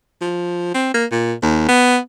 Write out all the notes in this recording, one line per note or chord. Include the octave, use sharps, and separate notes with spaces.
F3
C4
A#3
A#2
D#2
B3